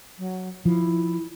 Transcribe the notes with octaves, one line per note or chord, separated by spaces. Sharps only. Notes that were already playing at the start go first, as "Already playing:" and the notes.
F#3
F3 E4